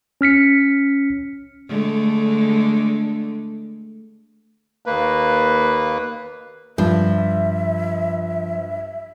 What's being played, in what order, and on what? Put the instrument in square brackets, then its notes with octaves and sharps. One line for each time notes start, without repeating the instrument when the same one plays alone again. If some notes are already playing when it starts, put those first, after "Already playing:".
[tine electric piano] C#4 F6 B6 C#7
[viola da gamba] D3 G#3 A3
[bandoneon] D#2 A#3 B4
[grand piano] G2 [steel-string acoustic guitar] F3 [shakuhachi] E5